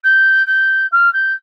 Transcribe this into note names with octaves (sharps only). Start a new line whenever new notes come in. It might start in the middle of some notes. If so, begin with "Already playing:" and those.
G6
G6
F6
G6